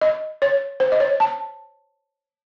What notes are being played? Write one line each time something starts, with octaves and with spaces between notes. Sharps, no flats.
D#5
C#5
C5
D#5
C#5
A5